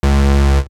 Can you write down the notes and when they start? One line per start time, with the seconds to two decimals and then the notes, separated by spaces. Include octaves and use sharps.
0.03 C#2